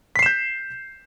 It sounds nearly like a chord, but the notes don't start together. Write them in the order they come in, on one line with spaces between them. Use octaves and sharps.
B6 C7 E7 G6